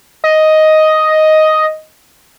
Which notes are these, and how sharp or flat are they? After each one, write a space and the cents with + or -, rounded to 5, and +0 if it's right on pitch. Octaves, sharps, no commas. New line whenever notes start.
D#5 +5